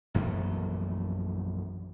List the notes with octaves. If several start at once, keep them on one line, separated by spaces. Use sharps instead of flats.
A#1 F#2 E3 A3